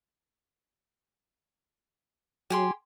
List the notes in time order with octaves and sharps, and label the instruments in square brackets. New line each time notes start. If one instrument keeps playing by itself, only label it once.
[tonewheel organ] F#3 [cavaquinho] G4 G#4 C6